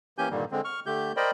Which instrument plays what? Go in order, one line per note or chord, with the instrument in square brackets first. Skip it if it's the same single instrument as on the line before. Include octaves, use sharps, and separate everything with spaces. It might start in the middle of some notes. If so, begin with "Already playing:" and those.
[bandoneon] E3 A#3 C#4 G4 G#5 G6
G2 A#2 D3 D#3 G3 A#3
D3 G#3 C4
C#6 F6
D3 A3 G4 G6
A#4 C5 D5 D#5 G5 B5